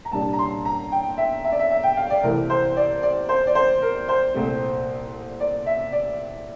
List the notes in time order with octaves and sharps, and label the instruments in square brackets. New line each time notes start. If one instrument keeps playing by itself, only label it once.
[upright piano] A#5
C2 A#2 G3 D4 A5
A#5
C6
A#5
G5
E5
E5
D5
E5
E5
G5
F5
D5
C2 C3 E3 A3 C4 A#4
C5
D5
D5
C5
D5
C5
A#4
C5
C2 A#2 A3 C4
D5
E5
D5